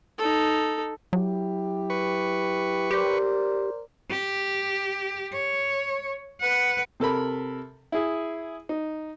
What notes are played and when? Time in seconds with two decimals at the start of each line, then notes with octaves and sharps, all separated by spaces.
0.18 D#4 A4
1.13 F#3 E4 G4
1.90 B4 C#6
2.91 G4 A#4 C5 D5
4.10 G4
5.33 C#5
6.41 B4 F#5
7.00 C3 A4 A#4 B5
7.92 E4 G#4
8.69 D#4